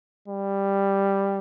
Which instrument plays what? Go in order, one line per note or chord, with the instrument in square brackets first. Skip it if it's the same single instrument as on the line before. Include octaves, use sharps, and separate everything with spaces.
[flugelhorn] G3